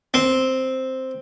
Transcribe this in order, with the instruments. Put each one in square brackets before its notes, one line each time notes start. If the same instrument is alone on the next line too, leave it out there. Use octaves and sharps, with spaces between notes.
[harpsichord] C4